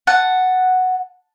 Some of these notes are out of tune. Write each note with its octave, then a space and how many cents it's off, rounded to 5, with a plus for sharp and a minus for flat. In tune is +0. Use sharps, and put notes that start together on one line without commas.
F#5 +0 A5 +5